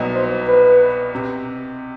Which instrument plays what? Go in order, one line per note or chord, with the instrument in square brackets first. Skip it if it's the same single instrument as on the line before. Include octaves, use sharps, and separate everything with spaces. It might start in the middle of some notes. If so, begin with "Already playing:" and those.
Already playing: [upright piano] C2 B2 F#3 B3 D#4
[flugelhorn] C5
B4
[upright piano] C3